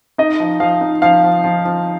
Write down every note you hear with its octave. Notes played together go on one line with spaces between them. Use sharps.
D#4 D#5
F3
F3 F5
D#4
F3 F5
F3
F3
F3